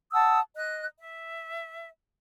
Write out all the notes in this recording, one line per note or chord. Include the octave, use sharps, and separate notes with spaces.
F#5 A5 D#6 E6
D#5 F#6
E5